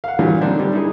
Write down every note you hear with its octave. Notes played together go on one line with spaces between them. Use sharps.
F5 F#5
A#2 D3 E3 F#3 G3
D3 G3 C4 D4 D#4
D3 G3
D#4 E4 G#4